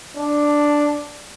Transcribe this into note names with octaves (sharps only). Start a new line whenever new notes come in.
D4